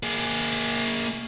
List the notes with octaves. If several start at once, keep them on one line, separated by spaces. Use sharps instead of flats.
A#3 G#4